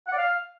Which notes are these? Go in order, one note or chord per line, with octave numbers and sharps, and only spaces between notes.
F#5
D5
F5